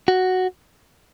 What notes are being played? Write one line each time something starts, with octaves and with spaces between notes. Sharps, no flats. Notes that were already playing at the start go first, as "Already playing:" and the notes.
F#4